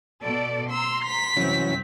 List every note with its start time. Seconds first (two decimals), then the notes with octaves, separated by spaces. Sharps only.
0.23 B2 A4 D5
0.71 A#5 C6 E6
1.04 B6
1.37 C2 F#2 E3 F#3 C4 C#4